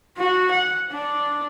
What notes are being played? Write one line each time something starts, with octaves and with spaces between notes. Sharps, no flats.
F#4
F#5
D4